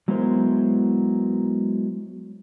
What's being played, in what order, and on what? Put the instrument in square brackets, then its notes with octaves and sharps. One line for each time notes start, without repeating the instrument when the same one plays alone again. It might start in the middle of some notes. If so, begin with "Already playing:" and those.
[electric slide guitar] F#3 G#3 B3 E4 A#4 C5